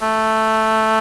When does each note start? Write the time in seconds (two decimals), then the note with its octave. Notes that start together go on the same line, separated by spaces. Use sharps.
0.02 A3